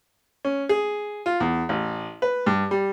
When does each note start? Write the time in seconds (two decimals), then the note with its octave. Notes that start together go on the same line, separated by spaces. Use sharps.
0.45 C#4
0.69 G#4
1.26 F4
1.40 E2
1.69 A1
2.22 B4
2.46 G2
2.71 G3